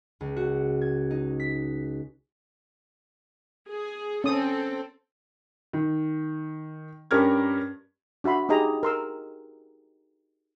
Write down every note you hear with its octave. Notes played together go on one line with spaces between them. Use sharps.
C#2
F#4
G#6
D#4
B6
G#4
C4 C#4 A4 D#6
D#3
G2 C#4 G4 A#4 F6 G#6
D4 F#4 E5 B5 C6
D#4 G4 G#4 D#5 A#5
A#4 C6 E6